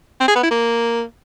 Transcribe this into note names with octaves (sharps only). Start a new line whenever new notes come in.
C4
G#4
B3
E4
A#3